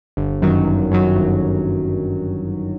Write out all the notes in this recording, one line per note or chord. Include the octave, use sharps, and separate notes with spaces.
G1
F#2 D#3 F#3
G1
F#2 D#3 F#3
G1